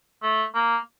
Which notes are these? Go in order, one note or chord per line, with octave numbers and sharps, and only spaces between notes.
A3
A#3